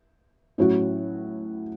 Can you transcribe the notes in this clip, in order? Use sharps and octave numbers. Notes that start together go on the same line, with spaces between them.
A2 F#3 C#4 F#4